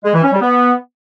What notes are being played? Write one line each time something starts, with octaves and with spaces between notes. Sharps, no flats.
G#3
E3
C#4
G3
B3